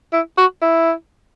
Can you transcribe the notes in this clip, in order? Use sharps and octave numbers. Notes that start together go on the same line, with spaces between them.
E4
F#4
E4